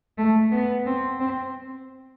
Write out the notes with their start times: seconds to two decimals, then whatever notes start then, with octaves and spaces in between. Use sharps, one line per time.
0.18 A3
0.52 B3
0.86 C4
1.20 C4